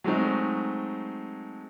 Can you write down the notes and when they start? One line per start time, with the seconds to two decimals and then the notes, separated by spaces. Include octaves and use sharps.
0.04 F#3 G#3 A3 C4 D#4